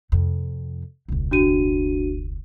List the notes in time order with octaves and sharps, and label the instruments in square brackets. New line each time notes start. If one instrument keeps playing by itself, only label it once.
[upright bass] F2 C3
E1 C#2
[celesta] D4 F#4 D#7